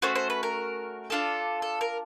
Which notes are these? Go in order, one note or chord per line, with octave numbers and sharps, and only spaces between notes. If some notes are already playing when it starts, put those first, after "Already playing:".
A3 C#4 F#4 C5
C5
B4
A#4
D4 F4 A4
A4
A#4